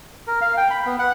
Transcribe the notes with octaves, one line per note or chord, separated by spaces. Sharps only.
A#4
F5
G5
B5
B3
F#5